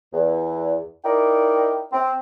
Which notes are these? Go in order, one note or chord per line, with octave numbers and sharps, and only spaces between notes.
E2
D#4 E4 A#4 D5 G5
C4